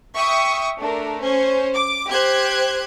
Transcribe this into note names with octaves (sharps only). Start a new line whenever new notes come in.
E5 G5 C#6 D#6
A3 D4 A#4
C#4 C5
D6
G4 C5 F#6 G#6